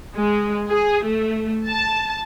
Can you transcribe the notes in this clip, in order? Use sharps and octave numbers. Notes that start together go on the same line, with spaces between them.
G#3
G#4
A3
A5